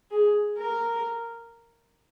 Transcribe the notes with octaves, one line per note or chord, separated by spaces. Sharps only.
G#4
A#4